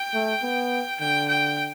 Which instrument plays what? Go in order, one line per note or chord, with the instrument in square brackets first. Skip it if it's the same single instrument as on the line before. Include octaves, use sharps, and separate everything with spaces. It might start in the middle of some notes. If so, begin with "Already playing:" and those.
Already playing: [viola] G5
[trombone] A3
B3
[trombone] D3 [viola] G5
[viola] G5